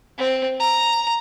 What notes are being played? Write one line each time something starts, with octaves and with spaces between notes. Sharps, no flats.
C4
A#5